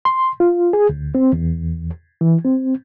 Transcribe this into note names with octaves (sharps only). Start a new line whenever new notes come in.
C6
F4
G#4
D2
C4
E2
E3
C4